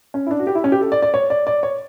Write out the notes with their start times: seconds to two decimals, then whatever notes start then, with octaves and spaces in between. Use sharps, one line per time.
0.14 C#4
0.26 E4
0.31 D4
0.39 F#4
0.47 G4
0.55 E4
0.64 C#4
0.72 G4
0.81 A4
0.92 D5
1.02 D5
1.14 C#5
1.30 D5
1.47 D5
1.63 C#5